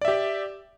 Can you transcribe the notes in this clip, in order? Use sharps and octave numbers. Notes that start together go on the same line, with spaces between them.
G4 D5 E5